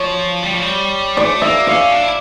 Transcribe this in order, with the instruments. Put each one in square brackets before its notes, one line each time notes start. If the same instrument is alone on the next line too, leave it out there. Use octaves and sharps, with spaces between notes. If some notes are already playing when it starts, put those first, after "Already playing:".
Already playing: [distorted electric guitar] F3 [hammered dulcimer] C#5
[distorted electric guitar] G3
F3
G3
[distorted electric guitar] A3 [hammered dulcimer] D5
[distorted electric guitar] A#3 [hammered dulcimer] E5
[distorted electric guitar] C#4 [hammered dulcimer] F5
[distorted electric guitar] D4
E4